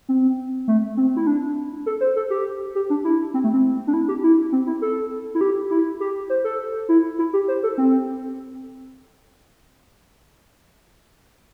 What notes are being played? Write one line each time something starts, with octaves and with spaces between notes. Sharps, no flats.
C4
A3
C4
E4
D4
A4
C5
A4
G4
G4
D4
E4
C4
A3
C4
D4
E4
G4
E4
C4
E4
A4
E4
G4
E4
G4
C5
A4
E4
E4
G4
C5
A4
C4